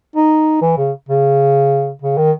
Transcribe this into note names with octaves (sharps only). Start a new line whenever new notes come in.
D#4
E3
C#3
C#3
C#3
D#3